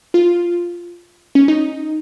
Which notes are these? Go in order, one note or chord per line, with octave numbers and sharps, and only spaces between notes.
F4
C#4
D#4